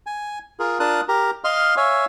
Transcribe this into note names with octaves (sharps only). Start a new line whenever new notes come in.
G#5
F4 G#4 A#4
D4 F4 A#4 A5 D#6 F#6
G4 A#4 A#5
D#5 F5 C6 F6
C#5 E5 F5 G#5